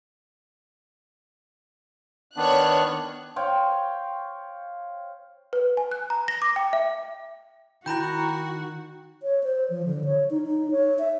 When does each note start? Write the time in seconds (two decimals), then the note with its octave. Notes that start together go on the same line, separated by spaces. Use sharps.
2.37 D#3 B3 D4 C#5 F#6
3.36 C5 C#5 F5 G5
5.53 B4
5.77 G#5
5.91 F#6
6.10 A#5
6.28 A#6
6.42 D6
6.56 G5
6.73 E5
7.86 D#3 E4 F#4 G5 A#5 B5 G6
9.23 C#5
9.44 C5
9.70 F3
9.86 D3
10.05 C#5
10.30 D#4
10.43 D#4
10.71 C#5
10.99 E5